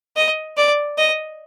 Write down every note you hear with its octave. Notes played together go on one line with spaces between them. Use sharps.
D#5
D5
D#5